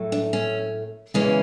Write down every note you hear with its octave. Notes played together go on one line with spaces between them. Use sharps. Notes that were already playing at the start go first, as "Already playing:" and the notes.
Already playing: A2 F#3 A3
D4
C#4
E2 C#3 E3 G#3 C#4